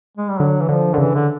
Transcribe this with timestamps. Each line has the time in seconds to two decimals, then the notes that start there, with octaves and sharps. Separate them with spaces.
0.17 G#3
0.29 G3
0.39 D3 F#3
0.60 E3
0.69 D3 F3
0.94 D3 D#3
0.98 C#3 E3
1.15 D3